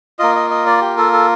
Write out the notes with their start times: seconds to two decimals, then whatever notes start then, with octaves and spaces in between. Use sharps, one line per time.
0.19 A#3 F4 D#5
0.35 D#5
0.50 D#5
0.66 D5
0.81 G4
0.98 A4
1.13 A4